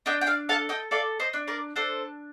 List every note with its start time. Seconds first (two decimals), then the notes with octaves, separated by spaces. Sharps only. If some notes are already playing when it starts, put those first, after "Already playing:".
0.06 D4 D#5 G5
0.21 G5
0.27 D5 F5
0.49 A4 F5 A5
0.69 D#5 G5
0.91 A4 D5 F5
1.20 C5 D#5
1.33 D4
1.47 A#4 D5
1.76 D4 A4 C5